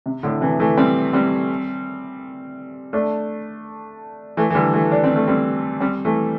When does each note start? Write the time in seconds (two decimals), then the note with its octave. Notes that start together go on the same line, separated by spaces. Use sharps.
0.06 C3
0.23 A2 D3
0.41 C3 E3
0.60 E3 A3
0.77 G3 C4
1.13 G3 C4
2.93 A3 D4
4.37 E3 A3
4.50 E3
4.55 D3 G3
4.73 E3 A3
4.92 D4
5.04 C4
5.16 A3
5.28 G3 C4
5.80 G3 C4
6.05 E3 A3